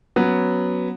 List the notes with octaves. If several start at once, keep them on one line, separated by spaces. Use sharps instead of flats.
F#3 B3 C#4